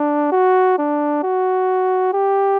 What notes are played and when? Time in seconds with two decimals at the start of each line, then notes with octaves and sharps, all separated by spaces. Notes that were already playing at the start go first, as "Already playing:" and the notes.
Already playing: D4
0.32 F#4
0.78 D4
1.24 F#4
2.14 G4